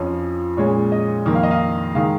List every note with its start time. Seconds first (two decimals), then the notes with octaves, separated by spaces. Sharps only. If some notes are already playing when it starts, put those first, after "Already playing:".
Already playing: F2 F3 C#4
0.57 A#2 G#3 C#4 C#5
0.92 D#5
1.26 F2 D#3 A#3
1.35 F5
1.43 D#5
1.51 F5
1.94 D#3 G#3 F5